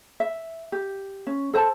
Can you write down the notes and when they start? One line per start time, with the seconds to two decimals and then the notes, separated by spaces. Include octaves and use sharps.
0.20 E5
0.72 G4
1.27 C#4
1.53 A4 C5 A5